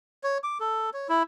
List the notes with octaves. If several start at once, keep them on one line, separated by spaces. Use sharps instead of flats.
C#5
D6
A4
C#5
E4